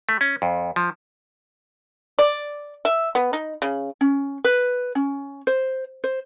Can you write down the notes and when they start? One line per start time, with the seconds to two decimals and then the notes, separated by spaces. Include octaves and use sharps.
0.09 A3
0.21 C#4
0.42 F2
0.76 F3
2.19 D5
2.85 E5
3.15 B3
3.33 D#4
3.62 C#3
4.01 C#4
4.44 B4
4.95 C#4
5.47 C5
6.04 C5